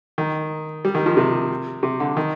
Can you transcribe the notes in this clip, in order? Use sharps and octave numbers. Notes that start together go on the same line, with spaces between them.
D#3
G3
D#3
F3
C3
C3
D3
D#3